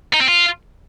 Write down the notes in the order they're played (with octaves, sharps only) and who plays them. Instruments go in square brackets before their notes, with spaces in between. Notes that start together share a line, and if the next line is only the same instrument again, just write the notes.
[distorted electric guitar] D#4
C4
F4